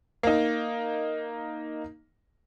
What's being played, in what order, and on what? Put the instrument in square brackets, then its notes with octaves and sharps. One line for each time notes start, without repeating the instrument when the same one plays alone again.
[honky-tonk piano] A#3 D#4